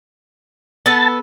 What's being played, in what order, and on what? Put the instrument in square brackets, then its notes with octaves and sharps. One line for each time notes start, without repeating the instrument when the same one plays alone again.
[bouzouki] B3 A4 [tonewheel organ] A5 A6